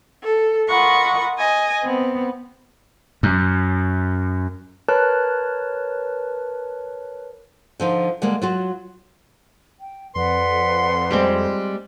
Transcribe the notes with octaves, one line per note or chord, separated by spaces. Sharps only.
A4
F4 A#4 D#5 F#5 B5 C#6
D#5 G#5
B3 C4
F#2
A#4 B4 C#5 A5 F#6
D3 F3 D#4
D3 G3 G#3 A#3
F#3 F4 F#4
G5
F2 B4 D5 F#5 C6
G3 G#3 C4